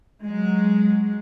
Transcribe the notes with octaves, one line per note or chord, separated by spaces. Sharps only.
F#3 G#3